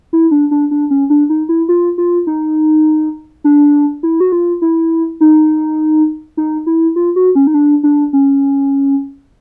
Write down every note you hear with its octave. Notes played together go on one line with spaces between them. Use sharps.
E4
D4
D4
D4
C#4
D4
D#4
E4
F4
F4
D#4
D4
E4
F#4
F4
E4
D#4
D#4
E4
F4
F#4
C#4
D#4
D4
D4
C#4